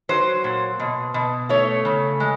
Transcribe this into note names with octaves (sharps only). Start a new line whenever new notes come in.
F#3 C5
A#2
B2
B2
A3 C#5
C#3
G#3